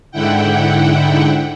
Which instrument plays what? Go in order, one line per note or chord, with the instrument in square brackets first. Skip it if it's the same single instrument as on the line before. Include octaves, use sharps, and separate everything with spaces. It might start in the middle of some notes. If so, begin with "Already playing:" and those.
[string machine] G#2 D3 E4 F#5 G5